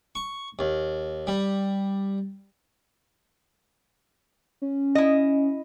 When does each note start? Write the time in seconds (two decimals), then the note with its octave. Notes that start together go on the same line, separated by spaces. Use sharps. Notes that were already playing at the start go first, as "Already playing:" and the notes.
0.15 C#6
0.59 D#2
1.27 G3
4.62 C#4
4.95 E4 D#5